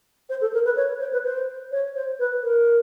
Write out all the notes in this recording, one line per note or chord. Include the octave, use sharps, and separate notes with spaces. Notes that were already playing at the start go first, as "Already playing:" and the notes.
C5
A4
A#4
B4
C#5
C5
B4
C5
C#5
C5
B4
A#4